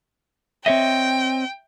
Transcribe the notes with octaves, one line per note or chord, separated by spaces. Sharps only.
C4 C#5 D#5 E5 G5